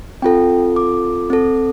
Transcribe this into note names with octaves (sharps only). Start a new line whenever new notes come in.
C4 F4 A4 G5
D6
C4 A4